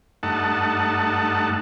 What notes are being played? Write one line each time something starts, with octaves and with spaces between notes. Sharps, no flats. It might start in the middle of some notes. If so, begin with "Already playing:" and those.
G2 A3 D#4 F#5 A5